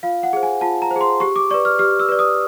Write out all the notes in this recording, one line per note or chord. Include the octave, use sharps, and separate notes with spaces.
F4 F5
F#5
G#4 C5
G#5
F4 A5
A#5
C5
G#4 C6
G4 C#6
D6
B4 D5 C#6
F6
G4 F6
E6
B4 D5
D#6